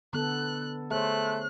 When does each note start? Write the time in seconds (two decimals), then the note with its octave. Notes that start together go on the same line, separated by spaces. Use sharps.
0.13 D3 B3 A4 F#6
0.91 A3 G#4 C5 C#5 F#6